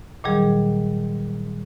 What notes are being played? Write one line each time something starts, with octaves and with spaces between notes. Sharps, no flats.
A#2 D#3 F#3 G3 G#4